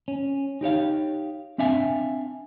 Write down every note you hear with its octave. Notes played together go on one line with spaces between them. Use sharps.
C#4
D#4 G4 C#5 F5
C4 D4 E5 F5 G#5